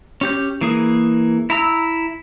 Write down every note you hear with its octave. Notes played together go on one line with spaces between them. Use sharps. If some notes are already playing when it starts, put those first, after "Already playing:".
C#4 G4 G6
E3 A#3 G#4
E4 A#5 E6